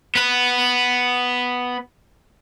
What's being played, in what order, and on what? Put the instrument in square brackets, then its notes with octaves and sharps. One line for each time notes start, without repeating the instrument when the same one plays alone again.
[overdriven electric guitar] B3 B4